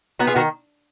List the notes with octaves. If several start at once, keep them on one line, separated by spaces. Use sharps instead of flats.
B3 D#4 F#4
F4 G#4
D#3 F#4 A#4